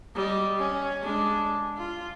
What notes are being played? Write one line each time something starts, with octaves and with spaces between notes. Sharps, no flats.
G3 D#5
C#4
G#3 D4
F4